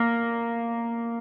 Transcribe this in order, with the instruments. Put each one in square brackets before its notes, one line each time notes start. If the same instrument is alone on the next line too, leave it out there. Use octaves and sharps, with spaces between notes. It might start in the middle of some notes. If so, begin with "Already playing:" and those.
Already playing: [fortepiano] A#3